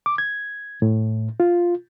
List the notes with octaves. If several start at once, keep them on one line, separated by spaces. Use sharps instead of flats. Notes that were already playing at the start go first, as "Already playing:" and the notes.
D6
G#6
A2
F4